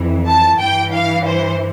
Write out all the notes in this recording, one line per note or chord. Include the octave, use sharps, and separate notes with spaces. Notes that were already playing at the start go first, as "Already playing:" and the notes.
Already playing: F2 E3
A5
G2 E3 G5
F5
C5